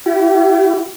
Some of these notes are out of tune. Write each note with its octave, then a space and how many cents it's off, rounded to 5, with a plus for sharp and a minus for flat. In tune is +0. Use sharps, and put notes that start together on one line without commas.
E4 +30 G4 -35